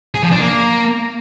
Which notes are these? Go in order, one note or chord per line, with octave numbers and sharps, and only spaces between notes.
G#4
F3
D4
A#3